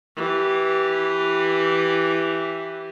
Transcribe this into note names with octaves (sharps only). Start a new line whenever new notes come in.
E3 G4